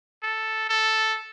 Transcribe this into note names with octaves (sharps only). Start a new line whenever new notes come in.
A4
A4